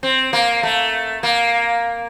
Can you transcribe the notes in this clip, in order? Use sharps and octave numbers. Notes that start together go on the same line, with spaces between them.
C4
A#3
A3
A#3